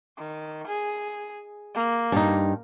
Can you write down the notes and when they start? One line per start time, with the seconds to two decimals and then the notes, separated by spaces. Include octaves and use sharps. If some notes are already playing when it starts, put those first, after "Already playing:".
0.18 D#3
0.67 G#4
1.75 A#3
2.12 G2 D#4